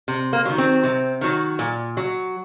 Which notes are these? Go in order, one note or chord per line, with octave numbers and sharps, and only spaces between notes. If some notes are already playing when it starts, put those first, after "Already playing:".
C3
A#3
D#3 F#3
C4
C3
D#3 F#3
A#2
F#3